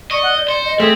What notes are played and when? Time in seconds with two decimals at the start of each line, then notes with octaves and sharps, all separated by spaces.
0.11 D5 D#5 C#6
0.23 F#5
0.37 G6
0.49 C5 C#7
0.65 D#5
0.80 A3 C4 G#4 B6